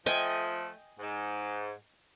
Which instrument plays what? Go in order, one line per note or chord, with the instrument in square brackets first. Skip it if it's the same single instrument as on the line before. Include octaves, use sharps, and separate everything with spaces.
[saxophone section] F3 A3 [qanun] D#5 G5 G#5
[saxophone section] G#2